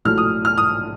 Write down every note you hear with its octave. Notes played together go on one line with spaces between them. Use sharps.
A#1 A2 F#3 A3 F6
D#6
F6
D#6